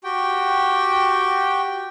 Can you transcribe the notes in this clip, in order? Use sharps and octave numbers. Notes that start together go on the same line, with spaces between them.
F#4 G4 G5